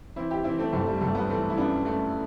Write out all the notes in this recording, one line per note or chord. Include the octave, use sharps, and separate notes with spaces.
E3 C4 E4
E4 G4
E3 C4 E4
A3 C4
G1 A3 C4
G3
G1 A3
G3 B3
E3 A3 C4
E4
F#2 B3 D4
F#2 A3